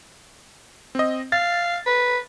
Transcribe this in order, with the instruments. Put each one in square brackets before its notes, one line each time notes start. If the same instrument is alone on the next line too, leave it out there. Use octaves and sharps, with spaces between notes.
[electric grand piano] C4 D#5
[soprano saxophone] F5 [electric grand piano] A6
[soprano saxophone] B4